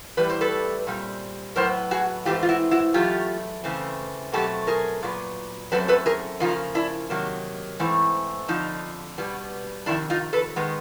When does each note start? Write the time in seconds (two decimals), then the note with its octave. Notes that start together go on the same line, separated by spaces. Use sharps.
0.17 A2 E3 G3 B4
0.29 C5
0.41 A4 B4
0.87 A#2 G3 C4
1.56 A2 F#3 B3 A#4 C5
1.91 F#4 G#4
2.25 G#2 E3 A3 C4 F4 G4
2.43 F4
2.49 E4 F#4
2.71 E4 F#4
2.94 E2 B2 F#3 A3 F4 G4
3.64 C#3 E3 A3 C4
4.33 B2 F#3 A3 C4 G4 A4
4.67 G#4 A#4
5.03 A#2 F#3 B3
5.72 F#2 D#3 F#3 A3 C4 A4 B4
5.88 A4 B4
6.06 G#4 A#4
6.40 C#3 F3 A#3 D#4 F4
6.75 D4 E4
7.10 C3 D#3 F#3 A#3
7.80 G#2 E3 A3 C4
8.48 F2 D3 F3 D#4
9.18 B2 G3 B3
9.86 F2 C3 D#3 D4 E4
10.10 D#4 F4
10.33 A4 B4
10.56 D#3 G#3 B3